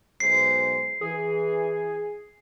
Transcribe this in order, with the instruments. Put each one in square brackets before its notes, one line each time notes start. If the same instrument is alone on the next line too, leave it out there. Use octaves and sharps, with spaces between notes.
[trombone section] B1 G#3 C5 [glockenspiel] C7
[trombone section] E3 [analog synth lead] G#4